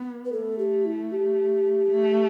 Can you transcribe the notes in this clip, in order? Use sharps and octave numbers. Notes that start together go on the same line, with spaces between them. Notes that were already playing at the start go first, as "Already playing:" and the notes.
Already playing: B3
B4
A3 A4
G4
E4
G4
A3